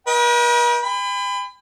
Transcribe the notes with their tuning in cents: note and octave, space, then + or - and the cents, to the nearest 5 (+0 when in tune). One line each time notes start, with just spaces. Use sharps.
B4 -45 D#5 +40 G5 -5
G5 +45 B5 +30